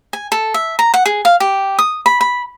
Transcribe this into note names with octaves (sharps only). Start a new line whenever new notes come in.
G#5
A4
E5
A#5
F#5
G#4
F5
G4
D#6
B5
B5